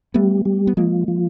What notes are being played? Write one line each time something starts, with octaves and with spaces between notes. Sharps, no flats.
G3 A3 B3
G3
B3
F3 G#3 A#3
F3